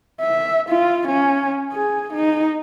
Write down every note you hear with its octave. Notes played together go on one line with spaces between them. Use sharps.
E5
F4
C#4
G#4
D#4